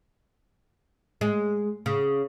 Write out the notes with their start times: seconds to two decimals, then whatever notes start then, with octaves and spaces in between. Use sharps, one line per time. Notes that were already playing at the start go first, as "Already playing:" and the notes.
1.21 G#3
1.86 C#3